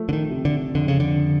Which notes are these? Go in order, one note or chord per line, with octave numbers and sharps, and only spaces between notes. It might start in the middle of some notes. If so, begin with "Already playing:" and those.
Already playing: F3 A3
D3
D#3
C3
D3
F2 D3
C#3
D3